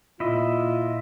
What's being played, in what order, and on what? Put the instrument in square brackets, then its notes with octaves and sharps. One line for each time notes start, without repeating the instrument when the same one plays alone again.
[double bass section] A#2 [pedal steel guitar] E4 D#5 [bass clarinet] F4